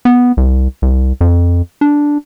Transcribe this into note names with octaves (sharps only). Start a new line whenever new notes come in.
B3
C2
C2
F2
D4